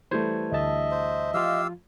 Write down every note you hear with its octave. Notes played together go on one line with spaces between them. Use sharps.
E3 G3 A3 B4 C5 G#6
D2 D#5 E5 A5
C5
F3 F4 G4 F5 E6